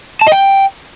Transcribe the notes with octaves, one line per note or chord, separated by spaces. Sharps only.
A5
D#5
G5